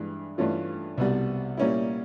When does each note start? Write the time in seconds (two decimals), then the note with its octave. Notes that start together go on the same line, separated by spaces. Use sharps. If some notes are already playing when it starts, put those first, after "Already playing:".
Already playing: G2 E3 G#3
0.38 G2 E3 A3 C#4 F4
0.98 C2 B2 G3
1.57 A#2 G3 A#3 C#4 E4